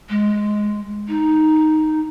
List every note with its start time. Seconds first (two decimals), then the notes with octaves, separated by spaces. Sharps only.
0.09 G#3
1.08 D#4